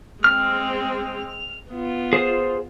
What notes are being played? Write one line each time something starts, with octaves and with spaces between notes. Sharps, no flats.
G#3 C4 F6
B3 F4
G#4 C5